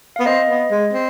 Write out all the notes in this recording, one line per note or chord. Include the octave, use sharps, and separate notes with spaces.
B3 F5
C4 D#5
B3
G#3
C4